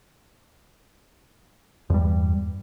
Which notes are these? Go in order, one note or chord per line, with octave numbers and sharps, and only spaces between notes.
E2 G2 G3